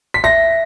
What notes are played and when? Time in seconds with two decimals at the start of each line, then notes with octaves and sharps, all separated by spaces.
0.14 B6
0.24 E5 A#6